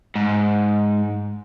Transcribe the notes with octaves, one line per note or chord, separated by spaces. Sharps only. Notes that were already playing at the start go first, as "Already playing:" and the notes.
G#2